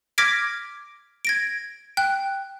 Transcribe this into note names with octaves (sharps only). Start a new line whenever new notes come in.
D6 F6 G#6 A#6 B6 D7
G#6 A#6 D7
G5 F#6